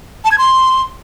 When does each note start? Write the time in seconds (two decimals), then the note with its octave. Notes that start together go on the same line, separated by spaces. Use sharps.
0.25 A5
0.31 G#6
0.38 C6